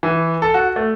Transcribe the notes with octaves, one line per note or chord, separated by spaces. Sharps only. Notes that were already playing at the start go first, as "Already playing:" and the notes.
E3
A4
F#4
A3